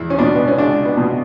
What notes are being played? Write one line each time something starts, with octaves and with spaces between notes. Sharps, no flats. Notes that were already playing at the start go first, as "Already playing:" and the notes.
Already playing: E2 E4
C#4
B2 D4
B3
C#4
C#2 D4
B3
B2